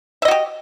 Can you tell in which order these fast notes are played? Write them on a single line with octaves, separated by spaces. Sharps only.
E5 D#5 F#4 G4